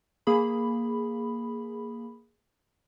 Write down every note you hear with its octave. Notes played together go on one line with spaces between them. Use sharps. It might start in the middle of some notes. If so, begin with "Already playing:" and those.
A#3 G#4 B5